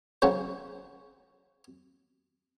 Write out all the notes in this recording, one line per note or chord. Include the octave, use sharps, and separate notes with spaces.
C#3 F#3 C#4 F#4 C5